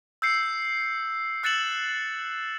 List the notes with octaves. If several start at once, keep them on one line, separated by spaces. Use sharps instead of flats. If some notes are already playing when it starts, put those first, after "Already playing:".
E6 G6 C7 C#7
E6 F#6 A6 C#7 E7 F#7